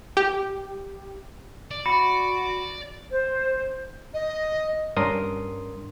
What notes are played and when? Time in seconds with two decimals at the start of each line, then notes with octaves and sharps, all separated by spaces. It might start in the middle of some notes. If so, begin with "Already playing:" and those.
0.17 G4
1.71 D5
1.86 F#4 B5 C#7
3.11 C5
4.13 D#5
4.97 G2 C#4 D4 A#4 C6 D#6